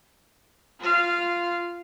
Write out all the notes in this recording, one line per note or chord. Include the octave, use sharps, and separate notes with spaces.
F4 F5